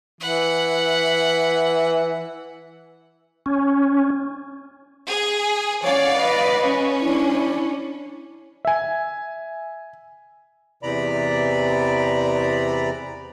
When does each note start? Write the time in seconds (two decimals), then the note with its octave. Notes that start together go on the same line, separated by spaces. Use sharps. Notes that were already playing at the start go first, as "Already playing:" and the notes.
0.21 E3 F#5 B5
3.46 C#4
5.08 G#4
5.83 C#4 C#5 D5 F5 F#5
6.15 B4 D#5
6.62 C#4
7.02 D4 E4
8.65 E5 G#5
10.83 E2 C3 E3 D5 A#5 B5